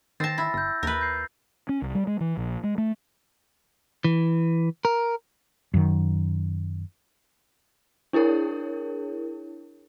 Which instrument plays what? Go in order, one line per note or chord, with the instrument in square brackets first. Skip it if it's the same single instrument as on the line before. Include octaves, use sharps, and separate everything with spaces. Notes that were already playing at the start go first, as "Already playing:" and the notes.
[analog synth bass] D#3 [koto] C4 A5 [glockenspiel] A6 A#6
[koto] E4
[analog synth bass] G1 [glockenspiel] E6 G6
[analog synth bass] D#2 [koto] A#4 B4
[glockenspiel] G6 C7
[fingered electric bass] C#4
C2
G3
G#3
E3
A#1
G#3
A3
[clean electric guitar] E3
A#4
[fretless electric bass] F#2 D#3
[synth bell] D4 E4 G#4 A#4 C#5